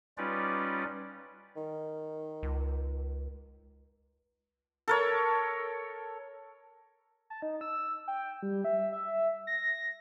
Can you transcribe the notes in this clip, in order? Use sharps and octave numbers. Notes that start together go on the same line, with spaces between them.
G3 C#4 D#4 F4 B4 D5
D#3
C#2
A4 A#4 C#5
A5
D#4
E6
G5
G3
E5
E5
A#6